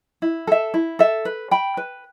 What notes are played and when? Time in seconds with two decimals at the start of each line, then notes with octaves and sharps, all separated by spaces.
0.22 E4
0.47 A4 E5
0.74 E4
0.99 A4 E5
1.25 B4
1.51 G5 B5
1.77 B4